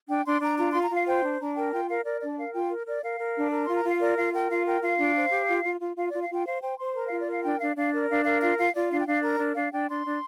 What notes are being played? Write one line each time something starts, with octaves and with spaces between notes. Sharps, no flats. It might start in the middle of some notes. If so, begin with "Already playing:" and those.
D4 G5
D4 C6
D4 A#5
F4 A#5
F4 C6
A#5
F4 F5
C5 G5
D4
D4 A#5
A#4 G5
F4 G5
A#4 F5
A#4 D5
D4 D5
A#4 F5
F4 G5
A#4
A#4 D5
A#4 F5
A#4
D4
A#4 A#5
F4 C6
A#5
F4 F5
A#4 D5
F4 F5
A#4 G5
F4 F5
A#4 G5
F4 F5
D4
C5
G4
F4
F4
F4
F4 F5
F4 D5
F5
F4 G5
C5 F5
C5 G5
C5 C6
A#4 A#5
F4 F5
D5
A#4 F5
D4 G5
D4 F5
D4 F5
A#4 D5
D4 F5
A#4 F5
F4 F5
F4 F5
F4 D5
D4 F5
G5
D4 F5
A#4 A#5
D4
D4 F5
D4 G5
D4 C6
D4